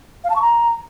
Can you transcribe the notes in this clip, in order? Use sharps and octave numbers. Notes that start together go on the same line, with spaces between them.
F5
A5
C#6
A#5